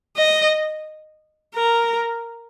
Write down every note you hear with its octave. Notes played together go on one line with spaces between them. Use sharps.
D#5
A#4